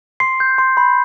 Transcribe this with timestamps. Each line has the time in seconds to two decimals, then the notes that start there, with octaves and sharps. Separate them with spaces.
0.20 C6 C7
0.40 G6
0.58 C6
0.77 B5